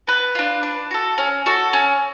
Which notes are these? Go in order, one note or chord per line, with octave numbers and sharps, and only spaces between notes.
B3 B4
D4 F4
D4
F#4 A4
C#4
F#4 A4
C#4